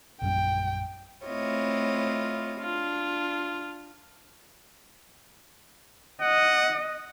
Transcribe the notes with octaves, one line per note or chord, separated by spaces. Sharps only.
A#1 F#2 G3 G5
A3 C4 E4 F4 C#5 D#5
D4 F4
D#5 F#5